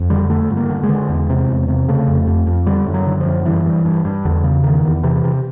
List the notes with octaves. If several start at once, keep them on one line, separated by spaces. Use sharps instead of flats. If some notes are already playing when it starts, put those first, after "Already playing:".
Already playing: F2
D3 G3
D3 A3
G2
A#3
D3
G#3
D3
E2
C3
E2
C3
C#3 A3
F2
F2
F2
D3 G3
F#2
F#3
D3
F3
F#2
G2 E3
G2
G2
G2
E2 D3
C#3
E2 D#3
E2
C3 E3
C3